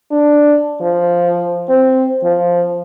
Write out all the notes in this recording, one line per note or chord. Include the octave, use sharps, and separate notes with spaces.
D4
F3
C4
F3